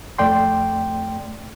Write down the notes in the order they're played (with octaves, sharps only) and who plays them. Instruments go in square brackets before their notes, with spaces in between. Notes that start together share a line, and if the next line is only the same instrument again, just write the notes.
[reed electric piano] F2 A3 D5 G5 C6